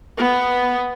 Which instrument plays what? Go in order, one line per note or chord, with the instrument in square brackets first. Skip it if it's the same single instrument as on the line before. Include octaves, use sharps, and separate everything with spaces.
[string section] B3